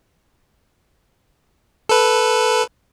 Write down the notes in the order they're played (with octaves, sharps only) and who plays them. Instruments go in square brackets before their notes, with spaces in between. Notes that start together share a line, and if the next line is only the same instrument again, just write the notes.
[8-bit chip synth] A4 B4